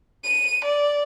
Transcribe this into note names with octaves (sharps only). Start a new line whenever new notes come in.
D#7
D5